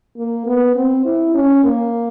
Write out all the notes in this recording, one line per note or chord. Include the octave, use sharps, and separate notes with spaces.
A#3
B3
C4
E4
C#4
A#3